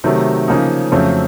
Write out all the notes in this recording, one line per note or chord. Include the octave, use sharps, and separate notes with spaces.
C3 D#3 F#3 A3
C#3 F3 A#3 D#4
F2 C#3 F#3 A3 C4